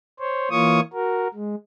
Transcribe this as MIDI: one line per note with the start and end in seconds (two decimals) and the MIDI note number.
0.20 0.49 72
0.20 0.49 73
0.51 0.80 52
0.51 0.80 58
0.51 0.80 65
0.51 0.80 73
0.51 0.80 85
0.51 0.80 87
0.93 1.28 66
0.93 1.28 70
1.34 1.55 56